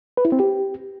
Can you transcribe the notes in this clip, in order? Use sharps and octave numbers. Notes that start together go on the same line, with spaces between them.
B4
E4
C4
G4